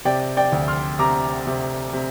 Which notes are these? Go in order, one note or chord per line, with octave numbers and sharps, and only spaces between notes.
C3 D5 G5
D5 G5
D2
C6 F6
C3 A#5 D6
C3
C3